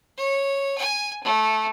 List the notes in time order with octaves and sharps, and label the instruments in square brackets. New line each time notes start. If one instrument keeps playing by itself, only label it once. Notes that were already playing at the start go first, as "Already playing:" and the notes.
[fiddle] C#5
G#5
A3